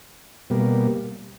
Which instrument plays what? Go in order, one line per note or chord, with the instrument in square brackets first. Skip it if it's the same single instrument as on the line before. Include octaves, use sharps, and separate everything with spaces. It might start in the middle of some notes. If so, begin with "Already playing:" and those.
[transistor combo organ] B2 G3 A#3